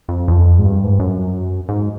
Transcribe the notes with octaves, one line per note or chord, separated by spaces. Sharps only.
F2
E2
F2
G#2
G2
G#2
G2
F#2
G#2